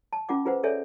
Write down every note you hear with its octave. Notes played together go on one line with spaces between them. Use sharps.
A5
C#4 F4 F#5 D6
F4 G#4 B4 C5 F#5
G#4 A4 C#5 D5 E5 G#5